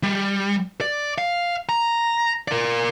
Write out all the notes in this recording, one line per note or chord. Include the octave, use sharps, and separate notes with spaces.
G3
D5
F5
A#5
A#4 D5